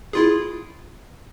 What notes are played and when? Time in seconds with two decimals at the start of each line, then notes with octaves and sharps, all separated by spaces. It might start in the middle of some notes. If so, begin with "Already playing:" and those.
0.13 E4 F4 G#4